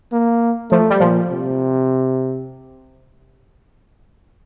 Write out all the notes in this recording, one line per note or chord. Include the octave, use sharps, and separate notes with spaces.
A#3
F3 A3
G3
A#2 F3
C3